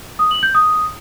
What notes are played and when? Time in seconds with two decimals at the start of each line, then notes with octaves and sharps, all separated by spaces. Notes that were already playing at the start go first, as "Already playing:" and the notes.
0.19 D#6
0.31 F#7
0.43 G6
0.55 D#6